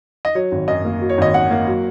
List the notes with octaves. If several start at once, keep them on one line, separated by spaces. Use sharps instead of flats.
D#5
F#3 C#5
G#1
F#2 D#5
A#3
F#3
C#5
G#1 D#5
F#2 F#5
A#3
F#3